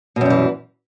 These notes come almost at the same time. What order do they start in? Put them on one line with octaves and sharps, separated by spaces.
B2 F#2 G3 E3